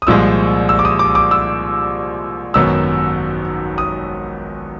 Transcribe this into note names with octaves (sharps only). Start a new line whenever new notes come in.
D#6
C2 A#2 F3 G#3 E6
E6
D6
D#6
D6
D6
E6
G#1 F#2 D#3 F#3 B3 E6
D#6